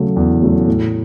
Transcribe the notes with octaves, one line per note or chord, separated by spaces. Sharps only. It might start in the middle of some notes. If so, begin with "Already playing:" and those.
Already playing: C#3 F#3 A3
E2
C#3 F#3 A3
A2